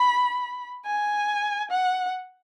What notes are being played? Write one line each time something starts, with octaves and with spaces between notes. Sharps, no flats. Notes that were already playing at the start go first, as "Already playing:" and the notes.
Already playing: B5
G#5
F#5